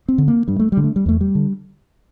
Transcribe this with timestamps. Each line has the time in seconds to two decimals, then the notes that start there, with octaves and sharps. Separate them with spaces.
0.09 C4
0.18 D3
0.28 A#3
0.48 G2 G3
0.59 A3
0.72 G3
0.77 D3
0.84 A3
0.96 G3
1.06 E2 A3
1.21 G3
1.35 D3